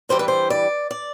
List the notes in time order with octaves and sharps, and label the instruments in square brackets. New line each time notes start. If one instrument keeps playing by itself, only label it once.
[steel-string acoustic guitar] G2 E3 G3 D4 C5
B4
C5
D5
D5